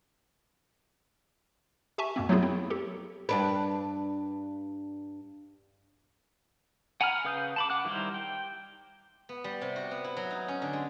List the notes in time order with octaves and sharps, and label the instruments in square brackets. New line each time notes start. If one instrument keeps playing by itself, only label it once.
[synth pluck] G4 E5 G#5 A5 C#6
F#2 B2 A#3 C4
F#3 A3 B3 E4 F4 G#4
C4 E4
G4 A4
[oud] G2 D4 B4
[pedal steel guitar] F#5 G#5 A#5 B5 F6
C#3 B4 F5 D#6 G6
A5 B5 D6
F#5 D6 F#6
D#3 G3 E4 A#4 C5
G5
[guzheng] B3
G3
C3
F#4
B3
E4
F#3
D#4
C#4
D3
G#3